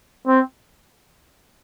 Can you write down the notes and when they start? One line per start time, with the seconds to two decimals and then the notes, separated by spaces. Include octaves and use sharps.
0.27 C4